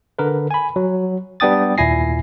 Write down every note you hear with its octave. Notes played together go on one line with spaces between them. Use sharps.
D3 A#4 B4
G#5 B5
F#3
G3 B3 D4 G5 D#6 A6
D#2 A#2 E4 G#5 A#6 C7